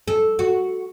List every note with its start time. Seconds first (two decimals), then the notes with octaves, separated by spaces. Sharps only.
0.08 A4
0.39 F#4